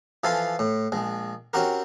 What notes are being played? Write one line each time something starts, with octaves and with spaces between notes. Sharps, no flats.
E3 F3 A4 F5 G#5 C6
A2
A#1 G#3
C4 C#4 F#4 G4 A#4